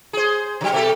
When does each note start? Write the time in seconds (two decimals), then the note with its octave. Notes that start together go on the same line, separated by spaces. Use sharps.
0.13 G#4 C5
0.61 C#3 F#3
0.72 B2 G4 A4